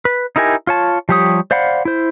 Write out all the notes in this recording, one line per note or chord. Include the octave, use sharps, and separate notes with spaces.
B4
D#4 E4 G4 A#4 G#5
F4 C#5 A5
F3 G3 G4 C#5 D#6
C5 D5 F5 F#5 B5
E4 C5